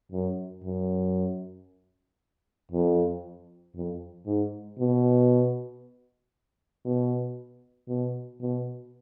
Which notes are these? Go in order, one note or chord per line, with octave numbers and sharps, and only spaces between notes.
F#2
F#2
F2
F2
G#2
B2
B2
B2
B2